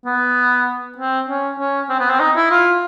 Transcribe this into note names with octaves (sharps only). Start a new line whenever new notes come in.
B3
C4
C#4
C#4
C4
B3
C4
D#4
E4
F4